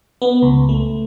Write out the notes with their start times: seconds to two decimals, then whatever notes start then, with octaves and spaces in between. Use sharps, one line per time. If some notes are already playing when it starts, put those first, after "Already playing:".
0.22 B3
0.42 C#2
0.69 A3